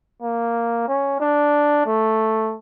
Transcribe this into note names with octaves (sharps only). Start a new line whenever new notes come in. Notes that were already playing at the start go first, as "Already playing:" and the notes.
A#3
C#4
D4
A3